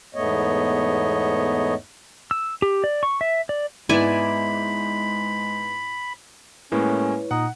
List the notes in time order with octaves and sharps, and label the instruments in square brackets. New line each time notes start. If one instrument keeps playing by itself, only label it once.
[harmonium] E2 G#2 A3 B3 C#5 D#5
[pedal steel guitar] E6
G4
D5
C#6
E5
D5
[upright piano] G#2 B3 E7 [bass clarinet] G#3 [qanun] E4 D5 G#5 [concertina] B5
[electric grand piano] A2 G#3 A#3 [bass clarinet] C#4 [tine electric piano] E4 B4 C#5
[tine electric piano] A#2 [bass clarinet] D#4 [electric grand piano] F#5